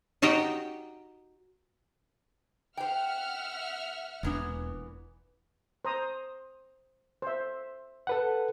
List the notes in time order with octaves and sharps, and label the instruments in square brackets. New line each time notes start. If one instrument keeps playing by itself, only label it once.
[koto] D#4 F#4 G4 D#5 F#5 G5
[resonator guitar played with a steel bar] C5 G5 [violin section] E5 F#5 F6
[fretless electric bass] E1 D4 [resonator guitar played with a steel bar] A#2 E3 B3
[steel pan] C5 A#5 D#6
C5 E5
[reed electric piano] A4 B4 F#5